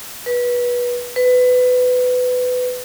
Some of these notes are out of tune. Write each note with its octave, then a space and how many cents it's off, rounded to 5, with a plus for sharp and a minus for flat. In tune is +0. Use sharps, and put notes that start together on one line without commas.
B4 -25
B4 +20